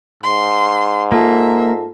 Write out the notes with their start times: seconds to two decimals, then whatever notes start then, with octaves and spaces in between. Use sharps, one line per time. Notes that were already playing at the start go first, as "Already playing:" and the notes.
0.23 G#2 C6
1.12 A#3 F4 A4 E5 A5